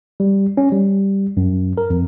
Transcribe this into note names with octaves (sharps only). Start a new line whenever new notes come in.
G3
C#4
G3
F#2
A#4
F2